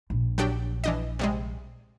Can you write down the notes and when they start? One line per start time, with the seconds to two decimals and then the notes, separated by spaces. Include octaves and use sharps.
0.10 A#1
0.38 F#3 D4 G4
0.84 E3 D4 D#5
1.19 C3 G3 G#3